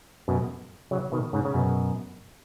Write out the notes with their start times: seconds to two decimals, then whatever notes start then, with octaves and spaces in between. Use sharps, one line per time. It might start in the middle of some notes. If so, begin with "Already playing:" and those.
0.28 F#2 B2
0.91 C#3 F#3
1.12 B2 D#3
1.33 G#2 C#3
1.45 C#3
1.54 F#2 B2